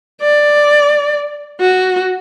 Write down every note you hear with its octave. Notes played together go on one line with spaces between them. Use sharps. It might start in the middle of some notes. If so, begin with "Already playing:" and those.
D5
F#4